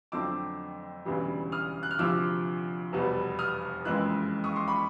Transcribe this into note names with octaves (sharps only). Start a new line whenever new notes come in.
F2 D3 F#3 A3 C4 D6 E6
E1 D2 C#3 E3 G3
D#6 F6
F#6
F6
D2 C3 F3 D6 E6
F1 E2 B2 G3 B3
D#6 F6
F#1 F2 C#3 E3 G#3 E6 F#6
C#6 D#6
C6 D6
B5 C#6